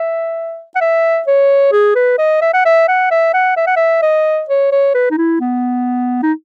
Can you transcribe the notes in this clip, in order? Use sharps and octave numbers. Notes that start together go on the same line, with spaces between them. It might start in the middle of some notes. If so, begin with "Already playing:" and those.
Already playing: E5
F#5
E5
C#5
G#4
B4
D#5
E5
F#5
E5
F#5
E5
F#5
E5
F#5
E5
D#5
C#5
C#5
B4
D#4
E4
B3
D#4